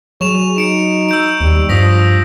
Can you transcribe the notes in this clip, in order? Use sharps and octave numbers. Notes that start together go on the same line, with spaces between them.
F#3 G#4 C#6 E7 F7
D#4 C#7 D7 E7
E6 G6 D7
D#2 G3
G2 F3 D#6 A#6 B6